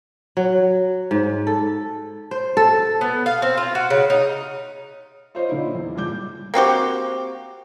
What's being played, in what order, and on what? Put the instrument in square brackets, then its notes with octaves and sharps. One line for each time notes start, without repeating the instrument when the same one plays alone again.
[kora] F#3
G#2
A4
C5
A4
[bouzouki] B3
F5
C4
F4
F#4
C#3
D#4
[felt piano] F4 C5 C#5 D#5
A#2 D3 D#4 E4
E2
C#2 G2 A#2 D6 G6
[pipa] A#3 C4 F#4 G4